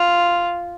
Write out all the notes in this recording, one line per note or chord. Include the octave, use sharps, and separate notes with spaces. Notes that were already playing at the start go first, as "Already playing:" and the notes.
Already playing: F4